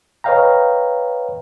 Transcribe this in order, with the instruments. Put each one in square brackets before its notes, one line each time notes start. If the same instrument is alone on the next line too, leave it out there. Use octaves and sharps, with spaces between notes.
[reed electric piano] B4 C#5 D#5 F5 G5 A#5